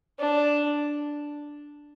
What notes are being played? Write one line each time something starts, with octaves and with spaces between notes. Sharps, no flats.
D4